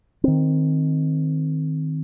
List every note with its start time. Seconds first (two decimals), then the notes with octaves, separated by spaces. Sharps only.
0.24 D#3 C4